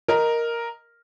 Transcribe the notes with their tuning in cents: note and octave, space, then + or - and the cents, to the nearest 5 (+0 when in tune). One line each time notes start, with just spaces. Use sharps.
A#4 +0 D#5 +0